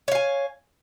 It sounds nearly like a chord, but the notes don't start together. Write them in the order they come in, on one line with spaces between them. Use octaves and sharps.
C#5 F5 G#5